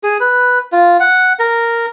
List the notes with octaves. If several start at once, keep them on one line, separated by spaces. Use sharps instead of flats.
G#4
B4
F4
F#5
A#4